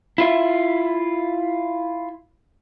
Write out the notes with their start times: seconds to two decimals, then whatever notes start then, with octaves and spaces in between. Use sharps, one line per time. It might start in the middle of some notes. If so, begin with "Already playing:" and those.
0.18 E4 F4 E5